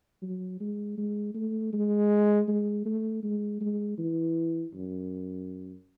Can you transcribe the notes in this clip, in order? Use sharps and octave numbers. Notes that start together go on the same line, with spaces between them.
F#3
G#3
G#3
A3
G#3
G#3
A3
G#3
G#3
E3
F#2